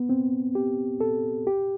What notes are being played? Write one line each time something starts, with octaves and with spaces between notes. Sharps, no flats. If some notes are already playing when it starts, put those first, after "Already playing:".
Already playing: B3
C4
G4
A4
G4